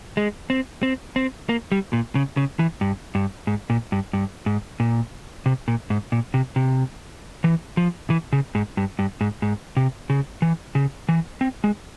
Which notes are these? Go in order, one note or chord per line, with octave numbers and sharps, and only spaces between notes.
G#3
C4
C4
C4
A#3
G3
A#2
C#3
C#3
E3
G2
G2
G#2
A#2
G2
G2
G#2
A#2
C3
A#2
G#2
A#2
C3
C3
E3
F3
E3
C#3
G#2
G2
G2
G#2
G#2
C3
C#3
E3
C#3
E3
C4
G#3